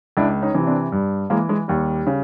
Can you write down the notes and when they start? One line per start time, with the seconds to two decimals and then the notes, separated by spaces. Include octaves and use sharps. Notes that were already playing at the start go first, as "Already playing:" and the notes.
0.17 C#2 D4 E4
0.42 C#4 D#4
0.54 C3 E3
0.67 C4 D4
0.92 G2
1.30 E3 G#3 A#3
1.49 G#3
1.68 D#2 G3
2.07 C#3